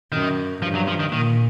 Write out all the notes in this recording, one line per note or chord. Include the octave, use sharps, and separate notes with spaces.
F#2 D#3
G2 F3
F#3
F3
D#3
A#2 D#3